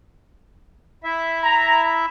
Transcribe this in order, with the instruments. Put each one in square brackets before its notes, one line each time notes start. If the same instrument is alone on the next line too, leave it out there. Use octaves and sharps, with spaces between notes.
[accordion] E4 E5
[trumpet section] A#5